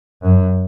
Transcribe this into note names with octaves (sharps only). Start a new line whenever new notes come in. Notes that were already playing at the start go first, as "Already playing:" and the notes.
F#2